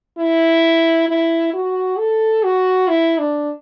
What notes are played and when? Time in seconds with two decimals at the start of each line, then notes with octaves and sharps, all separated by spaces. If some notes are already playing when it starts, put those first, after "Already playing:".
0.17 E4
1.08 E4
1.53 F#4
1.98 A4
2.43 F#4
2.88 E4
3.19 D4